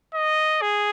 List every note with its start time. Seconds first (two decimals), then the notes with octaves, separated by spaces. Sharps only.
0.14 D#5
0.62 G#4